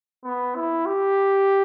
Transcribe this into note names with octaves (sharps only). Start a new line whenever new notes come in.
B3
E4
G4